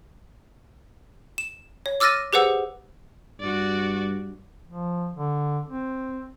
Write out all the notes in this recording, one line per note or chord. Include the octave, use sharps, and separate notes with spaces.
E7
C#5
D6 E6 F6 A6 A#6 D#7
G4 G#4 B4 C5 F#5 E6
G2 F#4 D5
F3
D3
C4